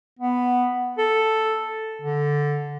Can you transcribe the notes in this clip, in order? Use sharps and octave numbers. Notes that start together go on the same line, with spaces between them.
B3
A4
D3